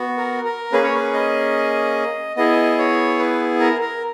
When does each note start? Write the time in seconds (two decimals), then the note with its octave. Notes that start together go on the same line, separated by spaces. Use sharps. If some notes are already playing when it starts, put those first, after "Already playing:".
Already playing: B3 F#4
0.18 A#4
0.45 A#4
0.72 A#3 C#4 G#4 B4
0.84 C#5
0.95 B4
1.13 D#5
2.36 B3 E4 G#4 D#5
2.78 C#5
3.19 B4
3.60 A#4
3.81 A#4